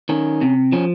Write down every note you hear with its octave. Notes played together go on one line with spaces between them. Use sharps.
D#3 C#4
C3
F3 C#4